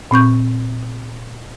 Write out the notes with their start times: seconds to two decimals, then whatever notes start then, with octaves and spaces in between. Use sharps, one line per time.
0.11 A#2 C4 C#6 G6